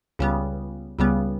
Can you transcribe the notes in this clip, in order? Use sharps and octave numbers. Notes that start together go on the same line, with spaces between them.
C#2 C#3 G3 B3
C#2 C#3 G3 B3